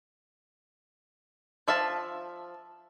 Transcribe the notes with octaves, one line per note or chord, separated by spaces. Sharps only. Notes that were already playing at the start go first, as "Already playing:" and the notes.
F3 E5 F5 A5